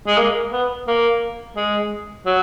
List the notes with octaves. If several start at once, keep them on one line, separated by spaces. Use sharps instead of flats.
G#3
A#3
B3
A#3
G#3
F#3